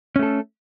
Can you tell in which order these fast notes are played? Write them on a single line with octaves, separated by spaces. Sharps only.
C#4 A3 A4